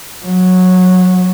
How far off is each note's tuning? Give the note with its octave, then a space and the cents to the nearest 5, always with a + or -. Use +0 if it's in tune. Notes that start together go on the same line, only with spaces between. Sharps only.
F#3 -15